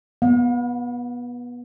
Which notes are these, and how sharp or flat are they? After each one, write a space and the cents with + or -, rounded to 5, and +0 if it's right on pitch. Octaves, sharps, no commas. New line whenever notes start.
B3 -20 F5 +45